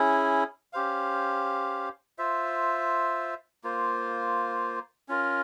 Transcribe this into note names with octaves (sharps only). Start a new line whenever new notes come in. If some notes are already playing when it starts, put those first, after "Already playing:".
Already playing: C#4 E4 G#4
C#4 G4 C5 F5
F4 C5 E5
A#3 F4 C5
C#4 F4 A#4